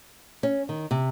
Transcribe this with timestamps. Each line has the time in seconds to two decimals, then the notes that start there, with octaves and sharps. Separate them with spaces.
0.43 C#4
0.69 D#3
0.91 C3